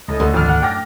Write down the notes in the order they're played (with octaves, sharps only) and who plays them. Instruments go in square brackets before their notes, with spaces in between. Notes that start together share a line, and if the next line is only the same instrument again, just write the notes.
[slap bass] C#2 [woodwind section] A2 A4 D#5
[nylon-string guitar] D2
[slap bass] G#1 [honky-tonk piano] F2 F6 [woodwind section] D4
[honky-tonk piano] F#5
[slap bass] F#2 [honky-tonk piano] G5 D6 A#6